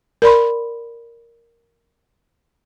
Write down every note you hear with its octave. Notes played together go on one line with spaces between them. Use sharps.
A#4 D5 B5 C6